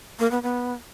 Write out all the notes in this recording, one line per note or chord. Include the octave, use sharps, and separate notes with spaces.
A#3
B3
B3